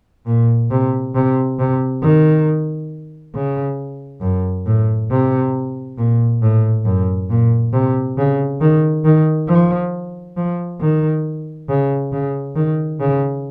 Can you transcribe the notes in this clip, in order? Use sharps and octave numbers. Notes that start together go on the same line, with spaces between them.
A#2
C3
C3
C3
D#3
C#3
F#2
A2
C3
A#2
A2
F#2
A#2
C3
C#3
D#3
D#3
F3
F3
D#3
C#3
C#3
D#3
C#3